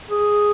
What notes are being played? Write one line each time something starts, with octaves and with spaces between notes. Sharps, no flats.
G#4